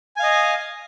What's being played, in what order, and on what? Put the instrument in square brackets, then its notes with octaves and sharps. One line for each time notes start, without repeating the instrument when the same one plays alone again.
[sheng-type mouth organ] G#5
F5
D#5